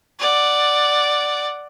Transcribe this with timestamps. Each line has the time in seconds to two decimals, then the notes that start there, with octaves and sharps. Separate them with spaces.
0.19 D5 F#5